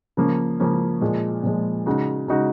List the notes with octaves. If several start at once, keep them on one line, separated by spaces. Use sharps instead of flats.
C#3 F3 A#3 C#4
C#3 F3 A#3 C#4
A#2 F3 G#3
A#2 F3 G#3
C#3 G#3 D#4 F#4
C#3 G#3 D#4 F#4